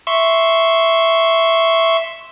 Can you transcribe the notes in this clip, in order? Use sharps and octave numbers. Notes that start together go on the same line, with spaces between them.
E5 C6 C#6